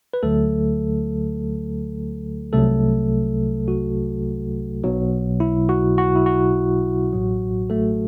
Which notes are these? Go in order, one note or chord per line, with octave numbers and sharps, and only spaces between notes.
B4
D2 D3 F#3 A3 A4
C2 C3 F#3 A3 A4
F#4
B1 B2 F#3
E4
F#4
F#4
E4
F#4
A1 A2 F#3
A3 A4